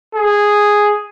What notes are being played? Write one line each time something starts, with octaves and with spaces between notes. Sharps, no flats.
G#4